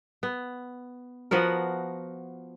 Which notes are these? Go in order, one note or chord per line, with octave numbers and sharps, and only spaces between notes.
B3
F3 B3 F#4 A#4